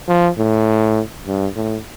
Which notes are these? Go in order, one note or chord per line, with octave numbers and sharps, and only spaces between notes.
F3
A2
G2
A2